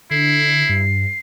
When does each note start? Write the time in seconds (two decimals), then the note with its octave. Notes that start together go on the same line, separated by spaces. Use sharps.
0.11 D3 E4 C7
0.69 G2